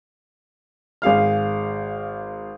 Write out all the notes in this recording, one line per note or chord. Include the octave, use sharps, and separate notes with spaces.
G#1 G#4 F5 F6